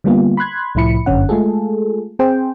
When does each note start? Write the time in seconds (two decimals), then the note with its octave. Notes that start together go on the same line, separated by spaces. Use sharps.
0.04 D3 G3 A#3 B3 F4
0.37 B5 C6 F#6 G#6
0.75 C2 A2 F3 E4 B5 C#7
1.06 G1 F#2 D3 C#4 F#5
1.29 G#3 A3 F4 G#4 A4
2.19 C4 G#4 C5 G5